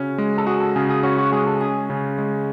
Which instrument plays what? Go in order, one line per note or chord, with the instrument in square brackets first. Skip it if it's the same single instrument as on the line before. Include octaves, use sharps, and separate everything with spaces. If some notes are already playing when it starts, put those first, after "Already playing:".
Already playing: [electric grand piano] C#3 C#4 F#4 [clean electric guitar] G#4
[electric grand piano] G#3
[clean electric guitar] A4
[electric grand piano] F#4 [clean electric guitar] G#4
[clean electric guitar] A4
[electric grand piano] C#3 [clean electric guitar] G#4
[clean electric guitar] G#4
[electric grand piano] C#4 [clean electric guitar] F#4
[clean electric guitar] F#4
[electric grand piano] G#3 [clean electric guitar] G#4
[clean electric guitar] A4
[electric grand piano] C#4 [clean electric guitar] G#4
[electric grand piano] C#3
G#3